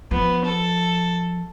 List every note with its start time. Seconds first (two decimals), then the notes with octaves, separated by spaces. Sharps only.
0.11 F3 B3
0.44 A4